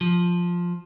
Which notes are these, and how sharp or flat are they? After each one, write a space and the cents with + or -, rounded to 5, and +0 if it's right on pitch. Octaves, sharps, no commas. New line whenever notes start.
F3 +5